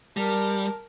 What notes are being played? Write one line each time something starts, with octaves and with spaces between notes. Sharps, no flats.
G3 A#4 A5